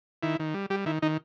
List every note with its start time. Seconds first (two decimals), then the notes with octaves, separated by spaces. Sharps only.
0.23 D#3 E4
0.40 D#3
0.54 G3
0.70 G3 G4
0.86 D#3 E4
1.02 D#3 D#4